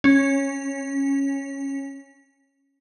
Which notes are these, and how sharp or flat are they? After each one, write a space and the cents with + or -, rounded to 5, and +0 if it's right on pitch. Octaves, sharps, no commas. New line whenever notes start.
C#4 -10